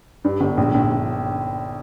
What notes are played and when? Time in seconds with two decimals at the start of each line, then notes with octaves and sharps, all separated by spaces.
0.24 G2
0.41 G1
0.57 A#1
0.74 A#1